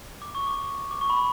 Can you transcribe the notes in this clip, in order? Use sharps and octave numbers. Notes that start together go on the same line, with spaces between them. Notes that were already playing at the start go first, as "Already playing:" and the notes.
D6
C#6
D6
D6
C#6
B5